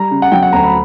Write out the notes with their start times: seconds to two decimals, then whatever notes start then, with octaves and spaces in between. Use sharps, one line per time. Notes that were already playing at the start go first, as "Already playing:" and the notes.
Already playing: G3 A#5
0.11 C#3
0.22 F#5
0.32 F#3 G5
0.42 F#5
0.53 D2 A#5
0.63 B5